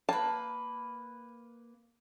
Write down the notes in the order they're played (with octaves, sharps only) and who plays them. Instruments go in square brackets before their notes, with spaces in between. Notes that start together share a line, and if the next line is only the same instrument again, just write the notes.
[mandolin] A#3 B4 [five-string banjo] A5